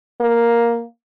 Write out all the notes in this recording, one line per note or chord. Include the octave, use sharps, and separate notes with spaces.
A#3